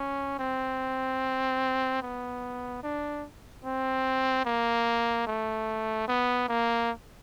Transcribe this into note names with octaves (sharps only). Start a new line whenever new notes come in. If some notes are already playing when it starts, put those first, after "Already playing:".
Already playing: C#4
C4
B3
D4
C4
A#3
A3
B3
A#3